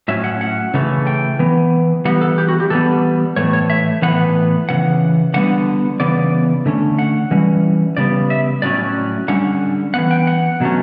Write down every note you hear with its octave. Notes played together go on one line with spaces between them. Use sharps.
A2 F#3 C#4 E5
F#5
F#5
C#3 E3 A3 C#4
G5
E3 B3
E3 G3 B3 F#5
A4
G4
F#4
G4
E3 G3 B3 A4
A2 E3 A3 C#5
C#5
E5
A2 E3 B3 F#5
C#3 E3 F#5
D3 G3 B3 F#5
C#3 E3 B3 D5
D3 A3 C#4
F#5
E3 G3 C#4
C#3 G3 B3 D5
E5
A2 F#3 C#4 D5
D3 G3 C#4 F#5
E3 B3 F#5
G5
F#5
B2 F#3 A3 C#4